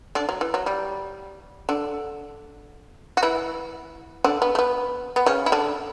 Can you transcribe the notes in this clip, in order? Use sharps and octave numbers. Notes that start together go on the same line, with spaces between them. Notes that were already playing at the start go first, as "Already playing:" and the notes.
D3 D4
F#3
E3
F#3
G3
D3 D4
F#4
E3 E4
D3 D4
B3
A3
B3
B3
C#3 C#4
E4
D3 D4